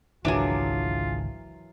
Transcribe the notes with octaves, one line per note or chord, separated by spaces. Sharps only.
G#1 C#2 E3 F#3 D4 F4 G#4 A#4